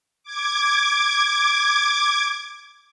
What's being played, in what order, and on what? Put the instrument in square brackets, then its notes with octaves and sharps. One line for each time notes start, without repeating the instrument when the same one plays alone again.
[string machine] D6 G#6